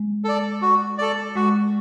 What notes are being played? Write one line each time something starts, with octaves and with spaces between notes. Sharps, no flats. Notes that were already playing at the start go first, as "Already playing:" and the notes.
Already playing: G#3
A4 D5
F#4
A4 D5
G#3 F#4